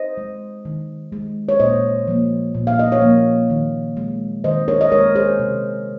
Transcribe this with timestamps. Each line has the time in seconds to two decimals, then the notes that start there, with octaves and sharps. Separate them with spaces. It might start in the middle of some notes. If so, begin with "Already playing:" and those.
Already playing: C5 D#5
0.17 G#3
0.65 D#3
1.12 G#3
1.49 C#5
1.60 A#2 C5 D#5
2.07 F3 A#3
2.55 A#2
2.67 F5
2.79 D#5
2.92 C#5 F5
3.02 F3 A#3
3.50 D#3
3.97 G#3
4.44 D#3 C5 D#5
4.68 A#4 C#5
4.81 D#5
4.92 G#3 A#4 C#5
5.15 G#4 C5
5.40 C3